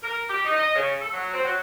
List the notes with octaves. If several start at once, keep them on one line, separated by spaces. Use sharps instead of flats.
A#4
G4
D#4
D#5
C#3
A4
F#3
C4
F#3